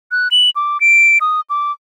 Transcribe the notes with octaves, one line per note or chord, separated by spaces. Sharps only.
F#6
F#7
D6
D7
D#6
D6